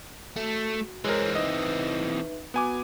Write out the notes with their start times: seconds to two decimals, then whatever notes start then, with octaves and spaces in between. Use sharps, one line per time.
0.36 A3 F#4
1.04 E3 G#3 C4 A#4 C#5
1.35 D#4 B4 D#5 E5
2.54 B3 F#4 G#5 D6